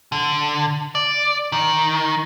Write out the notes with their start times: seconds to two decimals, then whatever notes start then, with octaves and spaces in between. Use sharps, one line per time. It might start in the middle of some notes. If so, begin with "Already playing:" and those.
0.12 D3
0.95 D5
1.52 D#3